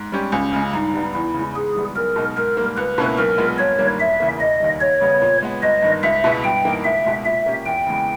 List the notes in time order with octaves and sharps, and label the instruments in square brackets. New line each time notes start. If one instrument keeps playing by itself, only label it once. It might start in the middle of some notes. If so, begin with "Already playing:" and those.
Already playing: [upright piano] G#2
G3 C#4 G4
[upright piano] C#2 [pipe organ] C#4
[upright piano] C#3 G#3
[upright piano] G2 [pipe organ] D#4
[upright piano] G3 B3
[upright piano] E2 [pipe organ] E4
[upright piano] C#3
G#3
[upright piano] G#2 [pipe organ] G#4
[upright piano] E3 G3 B3
[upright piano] B1 [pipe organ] A#4
[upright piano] B2 G#3 D#4
[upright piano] G#2 [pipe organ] A#4
[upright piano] G3 A#3
[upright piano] C#2 [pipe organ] B4
[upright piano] B2 A#3 C#4 E4
[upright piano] B1 [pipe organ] A#4
[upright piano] A#2 G#3 B3
[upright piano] G1 [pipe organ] C#5
[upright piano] G2 D#3 G3 A#3
[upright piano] E1 [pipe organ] E5
[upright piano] E2 C#3 E3 A#3
[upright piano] E1 [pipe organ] D#5
[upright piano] D#2 D#3 G3
[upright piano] D#2 [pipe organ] C#5
[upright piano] C#3 G3 B3
A#2
G#3 B3
[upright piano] G1 [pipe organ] D#5
[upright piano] G2 D#3
[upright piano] C#2 [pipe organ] E5
[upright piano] B2 G#3 B3 E4
[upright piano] G2 [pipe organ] G5
[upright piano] E3 A#3 D#4
[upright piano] C#2 [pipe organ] E5
[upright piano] B2 G#3 D#4
[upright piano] A#2 [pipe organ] E5
[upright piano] A#3 C#4 G4
[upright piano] E2 [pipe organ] G5
[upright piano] C#3 E3 G#3 B3